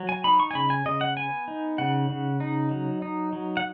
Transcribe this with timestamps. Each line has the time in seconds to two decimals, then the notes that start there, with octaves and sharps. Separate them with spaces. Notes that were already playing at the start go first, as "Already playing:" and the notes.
Already playing: F#3
0.09 G#5
0.24 D#4 B5
0.40 C#6
0.51 G#5
0.55 C#3 B5
0.70 G#5
0.86 C#3 D#5
1.01 F#5
1.17 B3 G#5
1.48 D#4
1.78 C#3 F#5
2.09 C#3
2.40 D#4
2.71 F#3
3.02 D#4
3.33 F#3
3.57 F#5